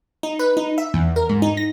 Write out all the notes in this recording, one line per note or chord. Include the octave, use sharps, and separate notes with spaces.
D#4
B4
D#4
E5
E2
A#4
G#2
D#4
A#6